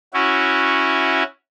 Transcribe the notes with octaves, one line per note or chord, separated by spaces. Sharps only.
C#4 E4 F#4